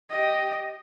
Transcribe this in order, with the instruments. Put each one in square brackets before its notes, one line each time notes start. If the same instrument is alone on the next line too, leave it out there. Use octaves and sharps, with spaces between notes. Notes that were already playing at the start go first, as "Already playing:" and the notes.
[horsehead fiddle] G4 D#5